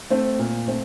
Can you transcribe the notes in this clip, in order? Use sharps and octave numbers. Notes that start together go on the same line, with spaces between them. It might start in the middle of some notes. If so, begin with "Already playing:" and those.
A3 C4
A#2
A3 C4